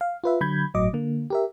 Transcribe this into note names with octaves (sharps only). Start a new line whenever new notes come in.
F5
F4 B4 E5
D3 F#3 B5 G6 G#6
G1 A2 F#3 D#5 D6
D3 A#3
G4 A#4 E5